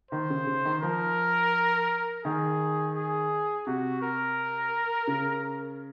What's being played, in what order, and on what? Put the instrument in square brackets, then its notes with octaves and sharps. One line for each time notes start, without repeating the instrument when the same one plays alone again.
[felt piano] D#3 [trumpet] C5
[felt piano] C#3
C#3
D#3
[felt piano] F3 [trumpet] A#4
[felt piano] D#3 [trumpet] G#4
[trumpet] G#4
[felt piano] C3 [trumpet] F#4
[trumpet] A#4
[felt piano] C#3